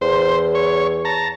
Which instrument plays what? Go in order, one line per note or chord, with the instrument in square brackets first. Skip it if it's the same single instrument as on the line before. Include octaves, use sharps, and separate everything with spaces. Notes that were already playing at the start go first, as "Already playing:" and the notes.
[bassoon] E2 [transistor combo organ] C5
[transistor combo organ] C#5
A5 A#5